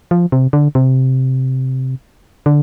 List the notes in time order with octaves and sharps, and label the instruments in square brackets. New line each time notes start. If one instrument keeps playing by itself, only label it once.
[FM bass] F3
C3
D3
C3
D3